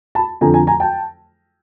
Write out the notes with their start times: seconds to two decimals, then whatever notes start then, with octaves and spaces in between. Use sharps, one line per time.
0.15 A5 B5
0.41 F2 D3 F3 G#5 A#5
0.54 G#5 A#5
0.67 G#5 A#5
0.80 G5 A5